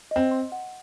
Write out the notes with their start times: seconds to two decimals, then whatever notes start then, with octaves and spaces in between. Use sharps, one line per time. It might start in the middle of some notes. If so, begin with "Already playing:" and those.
0.11 C4 D#5
0.31 C6
0.52 F#5